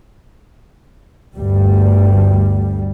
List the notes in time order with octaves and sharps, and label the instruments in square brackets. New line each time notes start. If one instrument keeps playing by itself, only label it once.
[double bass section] G1 D2 G2 G3